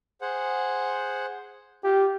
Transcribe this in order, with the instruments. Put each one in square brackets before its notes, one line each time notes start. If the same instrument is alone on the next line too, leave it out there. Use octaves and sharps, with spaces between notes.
[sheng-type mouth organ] G#4 C5 F#5
[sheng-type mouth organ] F4 [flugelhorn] G4